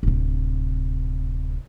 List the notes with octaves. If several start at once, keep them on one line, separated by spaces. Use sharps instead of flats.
D1 C3